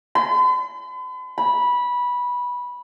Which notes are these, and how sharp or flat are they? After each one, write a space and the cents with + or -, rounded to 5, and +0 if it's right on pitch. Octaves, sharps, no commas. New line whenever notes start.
B5 +45
B5 -15